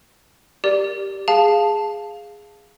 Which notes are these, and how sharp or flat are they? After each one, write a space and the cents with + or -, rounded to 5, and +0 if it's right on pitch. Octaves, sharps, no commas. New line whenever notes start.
G4 +0 A#4 +5 D5 +0
G#4 -5 F5 +0 A5 +0